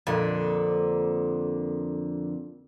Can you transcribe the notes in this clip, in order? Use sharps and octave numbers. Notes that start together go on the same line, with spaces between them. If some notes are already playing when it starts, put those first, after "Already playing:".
F2 A#2 D3